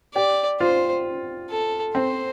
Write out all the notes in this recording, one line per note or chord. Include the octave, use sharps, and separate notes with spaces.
G4 D5
F4 C5
A4
C4 C5